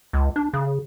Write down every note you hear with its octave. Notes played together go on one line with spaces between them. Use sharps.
C#2
D4
C#3